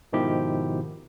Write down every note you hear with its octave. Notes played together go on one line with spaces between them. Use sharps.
G#2 B2 D#3 F3 E4 G4